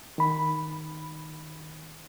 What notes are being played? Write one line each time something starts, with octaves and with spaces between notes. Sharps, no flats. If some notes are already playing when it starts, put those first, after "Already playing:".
D#3 B5